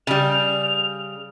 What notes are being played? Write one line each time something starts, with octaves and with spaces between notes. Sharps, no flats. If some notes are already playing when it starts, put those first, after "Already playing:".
C#3 G3 F7